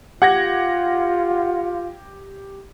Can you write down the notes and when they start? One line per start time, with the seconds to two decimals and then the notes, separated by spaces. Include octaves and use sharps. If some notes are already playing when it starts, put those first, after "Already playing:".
0.22 F4 G4 F#5 G#6 A#6